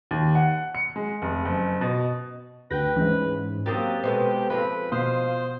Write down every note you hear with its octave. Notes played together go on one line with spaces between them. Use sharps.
D#2
F#5
C#7
G#3
F1
F#1
B2
D2 B4 G5 G6 A#6
G#2 E3 C#4
F#3 A#3 C4 G4 D#6 A6
B2 G#3 B3 A4 C5
F3 G#3 C4 B4
B2 C5 F5 C6 D#6